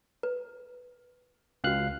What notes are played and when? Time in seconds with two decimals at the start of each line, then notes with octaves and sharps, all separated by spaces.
0.23 B4
1.64 C#2 C#4 F#4 F5 F#6